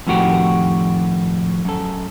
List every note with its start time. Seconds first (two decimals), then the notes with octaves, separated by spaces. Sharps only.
0.07 F2 A2 D#3 F#4 G4
1.65 F#2 A4